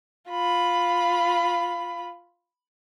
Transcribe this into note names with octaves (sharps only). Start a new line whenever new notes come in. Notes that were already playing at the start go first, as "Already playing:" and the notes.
F4 B5